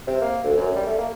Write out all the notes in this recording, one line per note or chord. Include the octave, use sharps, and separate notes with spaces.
C3
A#3
D2
F#2
G3
A3
A#3